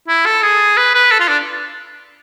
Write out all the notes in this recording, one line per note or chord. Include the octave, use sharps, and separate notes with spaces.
E4
A4
G#4
B4
B4
A4
F4
D4